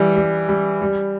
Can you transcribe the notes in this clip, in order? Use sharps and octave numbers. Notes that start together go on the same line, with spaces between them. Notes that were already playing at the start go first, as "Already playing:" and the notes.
Already playing: E3 G3
G3
G3
G3